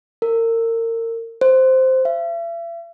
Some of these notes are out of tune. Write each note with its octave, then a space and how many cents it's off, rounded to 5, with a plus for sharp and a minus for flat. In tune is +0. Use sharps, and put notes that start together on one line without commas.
A#4 -30
C5 -5
E5 +40